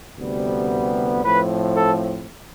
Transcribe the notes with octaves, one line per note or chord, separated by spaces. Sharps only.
D2 C3 G3 B3
A2 F3 C4 B4
A4